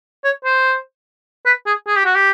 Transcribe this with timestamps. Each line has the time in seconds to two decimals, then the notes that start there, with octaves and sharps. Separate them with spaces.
0.24 C#5
0.44 C5
1.46 B4
1.66 G#4
1.87 G#4
1.96 G4
2.05 F#4
2.15 G4